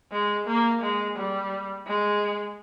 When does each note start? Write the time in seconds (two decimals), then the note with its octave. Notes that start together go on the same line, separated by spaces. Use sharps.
0.12 G#3
0.47 A#3
0.82 G#3
1.17 G3
1.87 G#3